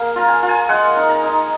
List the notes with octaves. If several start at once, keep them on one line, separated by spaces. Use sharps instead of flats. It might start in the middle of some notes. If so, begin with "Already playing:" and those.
Already playing: A#3 G#4
F4 A#5
G#5
F4
G#5
G#3 F#5
D#4
A#5
D#4